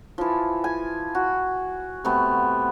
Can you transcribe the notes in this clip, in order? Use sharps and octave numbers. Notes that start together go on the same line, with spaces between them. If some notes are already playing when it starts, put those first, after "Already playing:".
E3 F3
G#5
F#4
C3 A3 B3